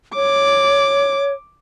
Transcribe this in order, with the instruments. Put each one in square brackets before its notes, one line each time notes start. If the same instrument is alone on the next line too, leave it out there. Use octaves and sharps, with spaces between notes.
[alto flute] C#5 [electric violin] D6